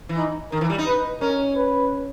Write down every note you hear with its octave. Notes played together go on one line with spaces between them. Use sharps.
E3
D#4
D#3 A#4
E3
G3
D#4
B4
C#4 A#4
B4